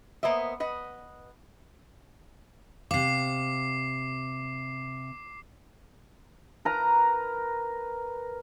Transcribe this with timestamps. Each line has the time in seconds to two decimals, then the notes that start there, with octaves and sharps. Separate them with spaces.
0.23 A#3 B3 C5 D#5 E5
0.60 B4 D#5 F#5
2.91 C3 F5 D6 C7
6.65 A#4 B4 A#5